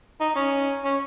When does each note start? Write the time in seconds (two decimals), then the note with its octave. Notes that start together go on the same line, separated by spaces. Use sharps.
0.20 D#4
0.35 C#4
0.84 C#4